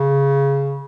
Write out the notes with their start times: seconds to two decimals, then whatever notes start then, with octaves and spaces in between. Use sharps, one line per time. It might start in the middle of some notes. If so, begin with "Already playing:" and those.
Already playing: C#3